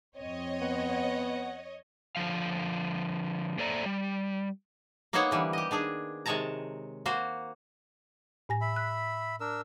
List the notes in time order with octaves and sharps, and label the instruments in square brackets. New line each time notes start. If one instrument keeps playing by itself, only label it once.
[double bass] F2 C4 [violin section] C#5 D#5
[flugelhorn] B3 [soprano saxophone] F#5
[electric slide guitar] D3 F3 F5
A#3 A4 C5 D5 E5 A#5
G3
[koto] A#3 B3 D#4 C5 C#5 F#5
D3 E3 G3
G4 D#5
D#3 D4 G#4
C3 D#3 G#3 C#5 A5 A#5
A#3 F#4 C5
[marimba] A2 G#5 A#6
[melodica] E5 B5
[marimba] F#6
[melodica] D4 A#4 E6